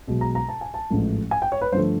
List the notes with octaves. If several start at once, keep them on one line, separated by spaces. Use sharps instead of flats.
B1 B2 G#3
A#5
A#5
A5
G#5
A5
A1 G#2 F3 A3
G#5
G5
C#5
B4
G2 D3 F3 A3 C5